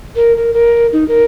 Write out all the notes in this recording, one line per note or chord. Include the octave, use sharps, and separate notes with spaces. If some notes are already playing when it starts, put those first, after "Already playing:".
A#4
A#4
A#4
D#4
A#4